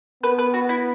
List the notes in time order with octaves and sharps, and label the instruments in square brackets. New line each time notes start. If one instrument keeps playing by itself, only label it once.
[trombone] B3 [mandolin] B4
[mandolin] B4
F#4
E4